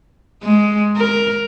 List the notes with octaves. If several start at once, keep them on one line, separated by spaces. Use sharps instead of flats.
G#3
A#4